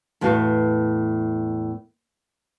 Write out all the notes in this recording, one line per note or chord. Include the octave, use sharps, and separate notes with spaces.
E2 A2 B3 F#4 F5